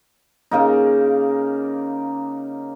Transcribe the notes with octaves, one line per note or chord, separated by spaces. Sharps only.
C#3 A#3 D#4